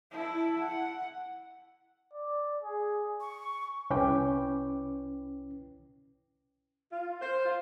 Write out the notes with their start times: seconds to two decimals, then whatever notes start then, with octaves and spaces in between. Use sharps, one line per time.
0.11 E4 A5
0.59 F#5
2.13 D5
2.63 G#4
3.20 C#6
3.90 C2 C#4 E4 B4 G5 D6
6.91 F4
7.21 C5
7.45 F4